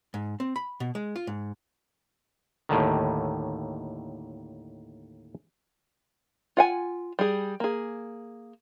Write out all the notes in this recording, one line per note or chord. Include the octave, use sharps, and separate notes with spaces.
G#2
C4
B5
B2
G#3
F4
G#2
D#2 A2 D3 D#3
F4 F#5 G#5
G3 G#4
A#3 G#4